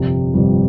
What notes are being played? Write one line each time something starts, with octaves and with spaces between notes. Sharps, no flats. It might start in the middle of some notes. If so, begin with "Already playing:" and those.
Already playing: G1 F2 C3 G3
G1 F2 C3 G3